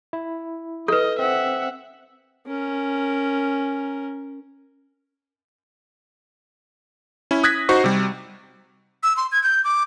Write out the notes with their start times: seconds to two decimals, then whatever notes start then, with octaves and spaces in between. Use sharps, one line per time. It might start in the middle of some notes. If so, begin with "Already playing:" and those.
0.13 E4
0.88 A4 B4 D#5
1.19 C4 E5 F#5
2.47 C#4 A#4
7.31 C#4 E4
7.44 D#6 F#6 G#6 A#6 B6
7.69 D#4 F#4 C5 C#6
7.84 C3 G3
9.03 E6
9.17 C6
9.32 G#6
9.43 G6
9.64 D6